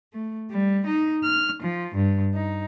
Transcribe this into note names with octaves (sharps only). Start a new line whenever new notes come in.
A3
G3
D#4
F6
F3
G2
D#4